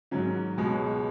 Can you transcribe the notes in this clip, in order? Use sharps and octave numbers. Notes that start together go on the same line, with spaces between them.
G#2 D#3 F#3 C#4
C#2 B2 G#3